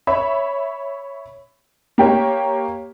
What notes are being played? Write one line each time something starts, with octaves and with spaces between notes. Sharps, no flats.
C#5 E5 B5
A#3 G4 C#5